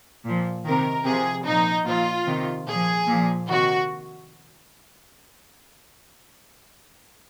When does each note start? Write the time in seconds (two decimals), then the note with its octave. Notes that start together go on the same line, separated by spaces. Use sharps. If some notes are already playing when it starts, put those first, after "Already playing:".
0.24 A#2 F3
0.64 C3 D#3 A#4
1.05 C3 F3 G#4
1.45 A#2 F3 D#4
1.86 A#2 F3 F4
2.27 C3 D#3
2.67 A#2 F3 G#4
3.08 A#2 F3
3.48 C3 D#3 F#4